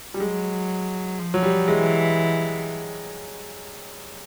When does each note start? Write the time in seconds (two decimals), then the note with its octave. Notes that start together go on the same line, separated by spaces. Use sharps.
0.14 G3
0.20 F#3 G#3
1.19 F3
1.34 F#3
1.43 G3
1.67 E3 G#3